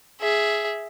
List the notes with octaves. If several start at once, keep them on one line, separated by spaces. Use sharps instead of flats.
G#4 E5